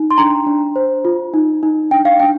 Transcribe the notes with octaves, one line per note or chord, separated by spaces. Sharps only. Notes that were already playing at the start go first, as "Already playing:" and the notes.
Already playing: D#4
C6
D4 A#5
D4
C5
F4
D#4
D#4
D4 G5
F5
D4 G5